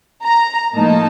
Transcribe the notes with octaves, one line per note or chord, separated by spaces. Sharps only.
A#5
A2 F3 A#3 D#4 A5